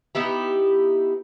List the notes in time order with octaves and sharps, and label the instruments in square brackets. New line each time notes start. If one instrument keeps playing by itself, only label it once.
[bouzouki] B3 D#4 E4 G4